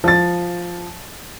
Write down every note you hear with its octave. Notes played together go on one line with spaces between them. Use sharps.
F3 A6